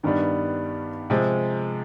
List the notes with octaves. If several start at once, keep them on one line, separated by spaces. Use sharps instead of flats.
G2 D#3 G3 B3 D4
C3 F3 G#3